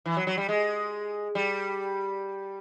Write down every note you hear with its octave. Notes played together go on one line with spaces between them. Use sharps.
E3
F#3
F#3
G3
G#3
G3